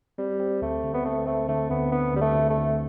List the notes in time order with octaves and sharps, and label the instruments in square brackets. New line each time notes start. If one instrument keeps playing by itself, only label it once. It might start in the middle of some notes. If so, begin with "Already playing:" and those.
[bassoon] G3 [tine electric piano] C4
[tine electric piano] C4
[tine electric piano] D2 [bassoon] A3
[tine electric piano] D3
[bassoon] B3
[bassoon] A3 [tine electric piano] C4
[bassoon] A3 [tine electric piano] C4
[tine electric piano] D3 [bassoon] A3
[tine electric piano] D2 [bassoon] B3
[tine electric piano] D3 [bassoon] B3
[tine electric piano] D2 [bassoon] G3
[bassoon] A3
[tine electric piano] D2
[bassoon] A3
[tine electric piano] D2